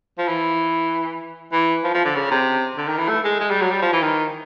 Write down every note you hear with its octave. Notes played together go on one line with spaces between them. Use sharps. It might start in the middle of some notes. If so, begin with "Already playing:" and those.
F3
E3
E3
F3
F3
D3
C#3
C3
D3
D#3
E3
A3
G#3
G#3
G3
F#3
G3
F3
E3
D#3